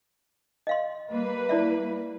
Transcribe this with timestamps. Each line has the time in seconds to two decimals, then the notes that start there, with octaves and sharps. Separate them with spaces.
0.67 D#5 F5 C6
1.10 G3 A#3 B4
1.49 E4 D5 E5